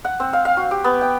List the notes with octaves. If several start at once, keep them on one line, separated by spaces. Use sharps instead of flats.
F#5
C4
F5
F5
F#4
G4
B3
G5